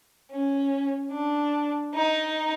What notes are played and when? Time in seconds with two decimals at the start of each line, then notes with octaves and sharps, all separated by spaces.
0.31 C#4
1.12 D4
1.94 D#4